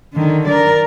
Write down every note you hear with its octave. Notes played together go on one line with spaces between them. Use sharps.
D3 D#3
A#4 D5